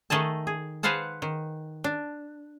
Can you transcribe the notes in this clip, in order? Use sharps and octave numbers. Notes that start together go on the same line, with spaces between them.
D#3 A3 G#4 D#5 A5
G#4
G#4 B4 C5 F5 F#5 A5
D#3
D4